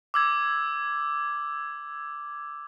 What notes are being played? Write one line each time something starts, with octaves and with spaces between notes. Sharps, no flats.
D6 E6 G#6